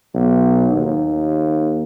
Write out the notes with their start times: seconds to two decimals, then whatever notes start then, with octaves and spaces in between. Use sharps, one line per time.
0.14 B1
0.72 D#2